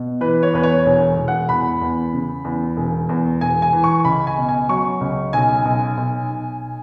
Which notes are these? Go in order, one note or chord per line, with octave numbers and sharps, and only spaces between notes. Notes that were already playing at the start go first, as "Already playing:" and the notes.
Already playing: B2
E3 B4
C#5
E2 B4
C#5
E1
E1
F#5
E2 B5
E2
C#3
E2
E1
E2
E1 G#5
G#5
E3
C#6
C#2 B5
G#5
B2
G#5
F#3 C#6
C#2
B1 G#5
B1
B1
B1